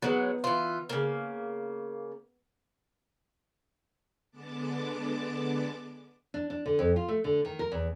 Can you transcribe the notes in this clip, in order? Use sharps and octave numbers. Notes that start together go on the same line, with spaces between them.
F#3 G#3 B3 D#4
E3 F4
C#3 A#3
D3 G#3 B3 A5 D6
D4
D4
D3
F2
F4
A3
D3
D#3
A#4
E2